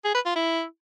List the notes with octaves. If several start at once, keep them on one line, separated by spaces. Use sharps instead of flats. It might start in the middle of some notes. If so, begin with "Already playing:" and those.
G#4
B4
F4
E4